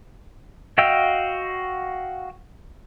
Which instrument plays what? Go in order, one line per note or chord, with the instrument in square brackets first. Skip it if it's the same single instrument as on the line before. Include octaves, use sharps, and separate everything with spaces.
[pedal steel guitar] F#4 D#5 F5 G5 E6